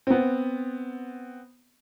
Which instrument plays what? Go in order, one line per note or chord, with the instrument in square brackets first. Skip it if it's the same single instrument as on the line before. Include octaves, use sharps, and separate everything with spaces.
[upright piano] B3 C4